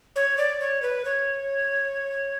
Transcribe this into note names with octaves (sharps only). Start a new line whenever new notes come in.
C#5
D5
C#5
B4
C#5